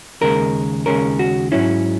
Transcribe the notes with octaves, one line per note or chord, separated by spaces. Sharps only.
D#2 C#3 G#3 A#4
D#2 C#3 G#3 C#4 A#4
F#4
G#2 F#3 C#4 E4